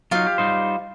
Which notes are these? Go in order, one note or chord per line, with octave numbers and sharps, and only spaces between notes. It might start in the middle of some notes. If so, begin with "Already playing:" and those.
F#3 D#4 F4 F5
G4
G3 D#4 C5